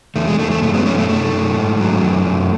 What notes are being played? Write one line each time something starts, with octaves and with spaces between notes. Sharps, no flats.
E2 A3
G#3
E2 A3
A3
F#2 A3
G#3 B3
F#2 A3 C#4
A3
F#2 A3
F#2
G#2
F#3
F#2
F#2